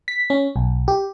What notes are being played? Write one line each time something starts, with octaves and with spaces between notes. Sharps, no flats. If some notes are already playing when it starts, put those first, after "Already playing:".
B6
C#4
B1
G4